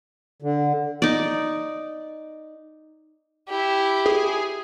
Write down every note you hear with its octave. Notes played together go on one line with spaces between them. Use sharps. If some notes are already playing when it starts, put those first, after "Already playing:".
D3
D#4 D5
E4 G4
G#4